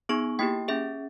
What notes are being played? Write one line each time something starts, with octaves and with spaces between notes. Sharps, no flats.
B3 D#4 G#4 C#6
A#3 E4 G4 G5
C#4 G#4 E5